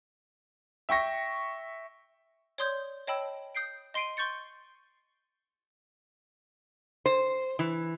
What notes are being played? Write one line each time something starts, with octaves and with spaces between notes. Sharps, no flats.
E5 G5 C#6 A#6
C#5 D5 C6 D#6 G6 G#6
C#5 D#5 G5 A5 B5 E6
D#6 G6 C7 D7
D#5 C6 C7 D7 D#7
C6 C#6 G6 A6 C#7
C5
E3